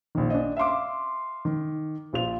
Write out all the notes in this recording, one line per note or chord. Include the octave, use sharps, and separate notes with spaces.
A#1 D#3
D4 D#5
E5 F5 C6 D6
D#3
A#1 F4 F7